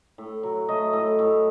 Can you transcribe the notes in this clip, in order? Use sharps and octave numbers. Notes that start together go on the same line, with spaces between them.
A2
F#3
A3 D#5
A2
A2